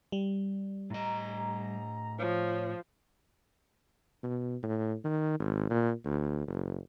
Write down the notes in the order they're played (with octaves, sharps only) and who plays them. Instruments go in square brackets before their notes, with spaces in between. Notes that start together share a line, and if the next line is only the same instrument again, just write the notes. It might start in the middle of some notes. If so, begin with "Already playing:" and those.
[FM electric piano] G3
[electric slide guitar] A2 D#5 [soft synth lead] A#5
[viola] F3 [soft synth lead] C#5
[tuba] B2
A2
D#3
G#1
A#2
D2
F#1